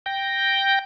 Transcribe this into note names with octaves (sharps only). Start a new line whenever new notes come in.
G5 G6 A#6